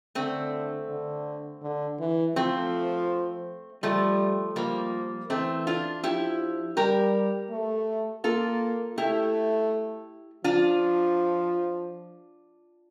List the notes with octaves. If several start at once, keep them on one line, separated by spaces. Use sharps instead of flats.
D3 A3 C4
D3
D3
E3
F3 A3 C4
F3 G3 A3
F3 G3 A#3
E3 A3 C4
D4 F4
F3 E4 G4
G3 G4 A#4
A3
A#3 F4 A4
A3 E4 G4
F3 D4 F4